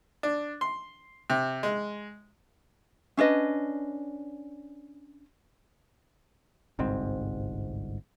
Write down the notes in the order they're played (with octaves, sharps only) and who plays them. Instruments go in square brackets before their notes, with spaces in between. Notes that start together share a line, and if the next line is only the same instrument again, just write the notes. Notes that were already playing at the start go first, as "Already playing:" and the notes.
[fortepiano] D4
C6
C3
G#3
[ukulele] C#4 D4 B4 D#5
[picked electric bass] G1 C2 G#2 C4